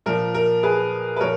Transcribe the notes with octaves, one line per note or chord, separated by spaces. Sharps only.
A#2 F3 A#4
A#4
G#4 B4
B4
A#2 F3 A#4 C#5